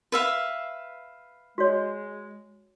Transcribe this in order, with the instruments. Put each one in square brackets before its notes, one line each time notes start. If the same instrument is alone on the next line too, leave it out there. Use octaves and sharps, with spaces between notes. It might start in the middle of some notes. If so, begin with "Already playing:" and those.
[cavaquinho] B4 E5 F5
[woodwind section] G#3 [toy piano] F#4 C#5